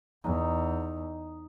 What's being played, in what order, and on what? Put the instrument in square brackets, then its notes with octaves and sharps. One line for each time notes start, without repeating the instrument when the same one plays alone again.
[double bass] E2 [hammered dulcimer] D#4